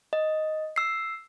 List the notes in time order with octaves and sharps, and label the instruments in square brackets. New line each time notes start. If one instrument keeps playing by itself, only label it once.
[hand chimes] D#5
E6 C7